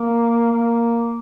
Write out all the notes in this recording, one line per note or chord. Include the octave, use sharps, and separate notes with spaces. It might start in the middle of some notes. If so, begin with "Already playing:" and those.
Already playing: A#3
A#3